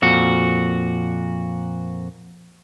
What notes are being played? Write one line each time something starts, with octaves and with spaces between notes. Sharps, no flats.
F2 A#2 F#4